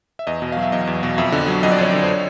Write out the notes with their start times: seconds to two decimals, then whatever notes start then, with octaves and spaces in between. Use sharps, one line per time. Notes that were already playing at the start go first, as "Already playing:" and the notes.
0.19 E5
0.27 E2 D#5
0.42 B2
0.52 F#3 F5
0.62 E5
0.72 E2 D#5
0.87 E2
1.03 B2
1.18 F2 E5
1.32 D3
1.48 F#3
1.63 F2 D#5
1.72 D5
1.78 F2 C#5
1.91 D3 D5
2.04 C5
2.08 C#5